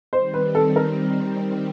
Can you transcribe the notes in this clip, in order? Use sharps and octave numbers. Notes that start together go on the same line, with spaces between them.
D#3 G3 C4 C5
B4
A4
A#4